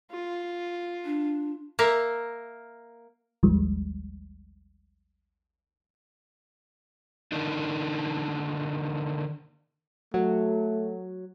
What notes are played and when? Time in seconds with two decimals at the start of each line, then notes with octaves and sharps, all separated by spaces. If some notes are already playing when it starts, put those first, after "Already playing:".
0.11 F4
1.05 D4
1.79 A#3 A#4 E5
3.43 A1 D#2 D#3 F3 G3 G#3
7.32 D3 D#3 A#3 D4 D#4
10.14 F#3 A3